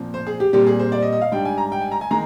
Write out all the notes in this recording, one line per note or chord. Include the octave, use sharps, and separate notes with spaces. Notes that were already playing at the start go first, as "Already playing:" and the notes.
Already playing: A#2 F3 C4
C5
G#4
G4
A#2 G3 C4 G4
G#4
C5
D5
D#5
D#5
F5
G#2 G3 D4 G5
G#5
A#5
G5
G#5
A#5
G#5
D#3 G#3 A#5